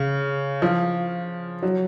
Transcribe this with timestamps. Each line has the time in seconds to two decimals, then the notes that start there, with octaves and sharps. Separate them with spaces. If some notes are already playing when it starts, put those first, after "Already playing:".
Already playing: C#3
0.62 F3
1.63 F#3